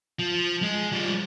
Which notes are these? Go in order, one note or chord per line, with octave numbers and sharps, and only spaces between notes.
F3
G#3
F3 G3